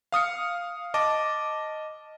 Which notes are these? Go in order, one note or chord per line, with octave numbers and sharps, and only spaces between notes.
F5 D#6 F6 C#7
D#5 A5 D6